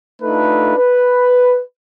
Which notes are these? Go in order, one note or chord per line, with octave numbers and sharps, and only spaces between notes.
A3 D4 D#4 F4 A4 B4
B4